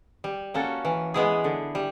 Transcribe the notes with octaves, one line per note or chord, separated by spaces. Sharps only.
G3
A#3 C#4 F#4 A4
E3
G#3 B3 E4 G#4
D3
G3